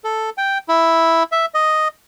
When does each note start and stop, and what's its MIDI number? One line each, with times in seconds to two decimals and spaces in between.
0.04 0.30 69
0.38 0.58 79
0.69 1.23 64
1.32 1.46 76
1.54 1.88 75